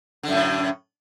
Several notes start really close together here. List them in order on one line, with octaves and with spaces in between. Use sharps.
D3 F#2 A2